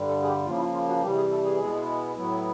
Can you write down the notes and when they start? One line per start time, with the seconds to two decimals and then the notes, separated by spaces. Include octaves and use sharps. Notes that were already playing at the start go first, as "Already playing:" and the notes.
Already playing: G2 D3 G3
0.08 A4
0.23 G#4
0.28 G4
0.46 C#3 F3 A#3 F4
0.56 E4
0.60 F4
0.74 F4
0.89 F#4
1.02 C3 E3 G3 G4
1.16 G#4
1.31 A4
1.44 G#4
1.58 B2 G#3 B3 E4
2.16 A2 F#3 B3 E4